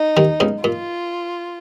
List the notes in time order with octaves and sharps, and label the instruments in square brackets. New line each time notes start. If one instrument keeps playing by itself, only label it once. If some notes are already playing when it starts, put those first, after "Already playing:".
Already playing: [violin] D#4
[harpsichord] D#2 D#3
C#2 C#3
[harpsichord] A#2 [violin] F4